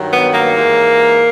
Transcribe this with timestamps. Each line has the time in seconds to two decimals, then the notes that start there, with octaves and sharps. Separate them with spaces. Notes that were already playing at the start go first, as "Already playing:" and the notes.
Already playing: G2 D#3 F#3
0.10 B3
0.33 A#3
0.55 G#2 E3